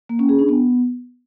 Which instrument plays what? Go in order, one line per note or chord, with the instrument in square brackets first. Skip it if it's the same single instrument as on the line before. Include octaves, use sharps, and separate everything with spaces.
[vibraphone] A#3
C#4
G#4
D4
B3